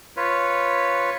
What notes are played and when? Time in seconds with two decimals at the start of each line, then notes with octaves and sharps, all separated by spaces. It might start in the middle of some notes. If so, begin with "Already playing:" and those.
0.17 F4 B4 C#5